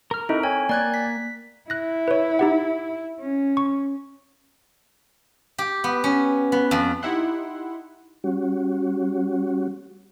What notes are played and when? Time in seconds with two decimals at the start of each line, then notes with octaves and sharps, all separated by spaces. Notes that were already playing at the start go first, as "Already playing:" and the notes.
0.11 A#4 F6
0.29 C4 D#4 E4 A4
0.43 C#5 G5 G#5
0.69 A#3 D5 F#6 G#6
0.94 B6
1.70 E4 F#6 A#6
2.08 B4 C#5
2.39 D#4 G4 F#5
3.21 C#4
3.57 C#6
5.58 G4
5.84 B3
6.04 C#4
6.52 B3
6.71 F2
7.02 D#4 E4 G4 F#5 C6
8.24 G3 C#4 F#4